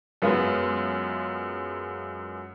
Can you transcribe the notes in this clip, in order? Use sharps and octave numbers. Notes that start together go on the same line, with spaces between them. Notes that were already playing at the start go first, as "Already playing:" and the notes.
F#2 G#3 B3 F4